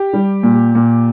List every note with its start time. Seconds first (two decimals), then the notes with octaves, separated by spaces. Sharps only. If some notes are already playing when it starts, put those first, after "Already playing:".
Already playing: G4
0.13 G3
0.43 A#2
0.75 A#2